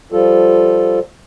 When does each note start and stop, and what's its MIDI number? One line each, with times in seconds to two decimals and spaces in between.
0.12 0.99 53
0.12 0.99 55
0.12 0.99 65
0.12 0.99 69